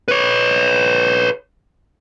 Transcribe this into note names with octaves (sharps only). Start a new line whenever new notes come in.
B4 C#5